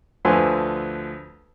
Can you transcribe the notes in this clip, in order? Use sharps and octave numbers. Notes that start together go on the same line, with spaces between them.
D2 D3 F3 B4 G#5 C6